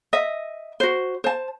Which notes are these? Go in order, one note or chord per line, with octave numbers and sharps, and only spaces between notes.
D#5 E5
F#4 C5
C5 A5